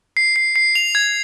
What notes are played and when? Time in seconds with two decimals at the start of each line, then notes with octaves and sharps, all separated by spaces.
0.17 C7
0.36 C7
0.56 C7
0.75 F7
0.95 G#6